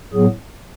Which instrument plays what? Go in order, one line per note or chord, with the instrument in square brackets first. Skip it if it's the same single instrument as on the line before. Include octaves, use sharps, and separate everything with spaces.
[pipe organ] A2 F#3 B3 G#4